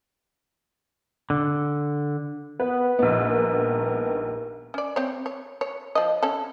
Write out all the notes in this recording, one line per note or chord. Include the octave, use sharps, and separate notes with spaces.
D3
B3 B4
A#1 D#3 F#3 B3 D#4
G2 D#3 A#4
C#4 D5
C4 C#5
C#5
C#5
F3 D#5
C#4 A4